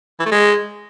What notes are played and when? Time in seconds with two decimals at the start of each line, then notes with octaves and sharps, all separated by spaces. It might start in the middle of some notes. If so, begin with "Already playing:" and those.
0.19 E3
0.26 A3
0.32 G#3